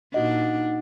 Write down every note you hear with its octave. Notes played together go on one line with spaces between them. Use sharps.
A#2 D4 D#4 F#4 D#5 F#5